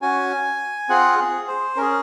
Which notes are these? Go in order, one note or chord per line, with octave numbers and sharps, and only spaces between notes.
C#4 F#4 G#5
C4 F4 G#4 F#5
G#4
C5
C#4 G#4 A#4